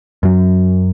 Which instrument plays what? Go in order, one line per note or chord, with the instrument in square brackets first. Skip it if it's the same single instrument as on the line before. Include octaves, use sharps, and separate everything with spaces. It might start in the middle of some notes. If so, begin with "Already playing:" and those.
[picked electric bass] F#2 F#3